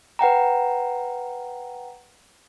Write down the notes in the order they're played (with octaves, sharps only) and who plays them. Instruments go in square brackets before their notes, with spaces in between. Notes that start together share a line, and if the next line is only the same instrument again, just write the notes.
[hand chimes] B4 F#5 G5 A#5